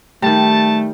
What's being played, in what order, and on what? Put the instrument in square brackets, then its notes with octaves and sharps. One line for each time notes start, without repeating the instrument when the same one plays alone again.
[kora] D#3 G3 [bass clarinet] A3 [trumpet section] A5